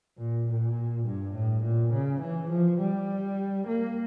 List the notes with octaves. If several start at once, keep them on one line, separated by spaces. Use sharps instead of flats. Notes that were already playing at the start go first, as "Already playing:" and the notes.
A#2
A#2
G2
A2
A#2
C#3
E3
F3
G3
A#3